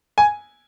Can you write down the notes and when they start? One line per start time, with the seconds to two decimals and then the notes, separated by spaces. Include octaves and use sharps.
0.18 G#5